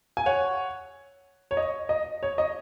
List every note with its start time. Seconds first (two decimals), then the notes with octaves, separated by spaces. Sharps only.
0.17 G#5
0.26 C#5 F#5
1.51 C#5
1.57 D#5
1.89 D#5
2.23 C#5
2.38 D#5